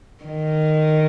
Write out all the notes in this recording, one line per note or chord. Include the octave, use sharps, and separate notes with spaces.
D#3